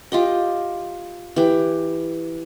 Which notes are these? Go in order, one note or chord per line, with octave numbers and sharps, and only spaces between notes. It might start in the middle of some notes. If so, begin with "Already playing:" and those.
F4 G4 D#5
E3 G4